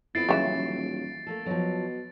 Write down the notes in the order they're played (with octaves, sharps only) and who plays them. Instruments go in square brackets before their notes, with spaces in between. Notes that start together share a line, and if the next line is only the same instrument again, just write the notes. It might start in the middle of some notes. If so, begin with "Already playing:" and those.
[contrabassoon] F2 [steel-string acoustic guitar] B3 E4 [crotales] A6 C7 D7
[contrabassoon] D#1 [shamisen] C#3 E3 E5 [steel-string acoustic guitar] F#3
[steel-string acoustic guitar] A3 A#3 A4
[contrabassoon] B2 [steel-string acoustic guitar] F3 F#3